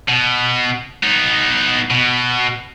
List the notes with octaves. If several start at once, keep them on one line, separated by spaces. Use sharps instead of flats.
B2
B3 D#4
B2